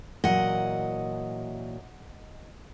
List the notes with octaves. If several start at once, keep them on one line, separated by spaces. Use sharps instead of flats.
A#2 E3 F#3 D#5 F#5